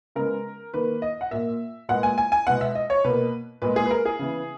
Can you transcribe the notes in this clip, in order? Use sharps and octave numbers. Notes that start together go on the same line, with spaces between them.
C#3 G#3 B3 A#4
D#3 A#3 B4
D#5
F#5
A#2 A#3 E5
A#2 G#3 B3 F#5
G#5
G#5
G#5
B2 G#3 B3 F#5
E5
D#5
C#5
B2 A#3 B4
A#2 G#3 B3 B4
G#4
B4
A#4
G#4
C#3 E3 B3